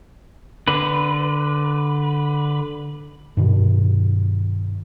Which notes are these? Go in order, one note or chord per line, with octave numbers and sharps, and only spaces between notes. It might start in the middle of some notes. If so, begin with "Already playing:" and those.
D3 B4
G2 B2 D#3